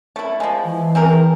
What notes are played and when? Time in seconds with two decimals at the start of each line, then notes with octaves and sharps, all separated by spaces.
0.16 A3 E4
0.40 F3 G#3
0.65 E3
0.95 C4 G#4 A#4